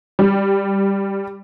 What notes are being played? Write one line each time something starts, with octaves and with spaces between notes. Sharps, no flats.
G3